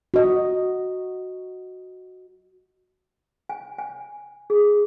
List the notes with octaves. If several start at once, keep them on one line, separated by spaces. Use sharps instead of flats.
F#4 D#5
G#5
G#5
G#4